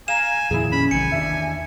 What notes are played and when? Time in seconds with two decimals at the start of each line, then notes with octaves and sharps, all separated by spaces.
0.08 F5 G#5 A#5 E7
0.51 F2 A#2 D#3 E4 G#4
0.72 C#4 B5
0.91 A1 C3 D#3 F#3 G#5 C#7
1.12 E2 D#3 D4 E5